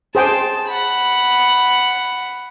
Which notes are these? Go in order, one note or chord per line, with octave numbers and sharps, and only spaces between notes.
G#4 C5 G5 A5
F#5 B5